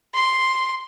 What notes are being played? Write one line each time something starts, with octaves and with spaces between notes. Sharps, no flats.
C6